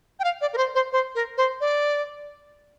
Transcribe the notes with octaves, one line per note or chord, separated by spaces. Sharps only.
G5
F5
D5
A#4
C5
C5
C5
A#4
C5
D5